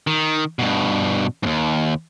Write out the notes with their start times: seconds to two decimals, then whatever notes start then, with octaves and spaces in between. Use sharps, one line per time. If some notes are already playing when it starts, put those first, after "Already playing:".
0.07 D#3
0.59 G2 B2
1.43 D#2 G#2